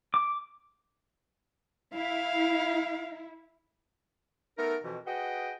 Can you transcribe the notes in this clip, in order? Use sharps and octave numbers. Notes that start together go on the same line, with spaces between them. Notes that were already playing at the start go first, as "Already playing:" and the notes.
D6
E4 F5
A3 B3 D#4 A4 A#4
F2 B2 E3
F#4 G#4 B4 D#5 G5